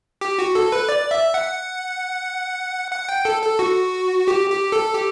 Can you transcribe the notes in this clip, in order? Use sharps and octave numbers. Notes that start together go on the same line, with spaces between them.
G4
F#4
A4
B4
D5
E5
F#5
F#5
G5
A4
A4
F#4
G4
G4
A4
G4